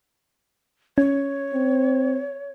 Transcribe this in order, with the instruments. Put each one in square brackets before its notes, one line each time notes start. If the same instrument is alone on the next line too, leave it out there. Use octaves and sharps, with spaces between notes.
[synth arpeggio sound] C#4 [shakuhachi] C#5
[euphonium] C4